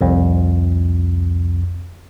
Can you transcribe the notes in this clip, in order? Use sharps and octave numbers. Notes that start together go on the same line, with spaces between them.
C2 F2